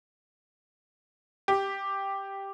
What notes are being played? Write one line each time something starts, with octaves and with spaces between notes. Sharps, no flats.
G4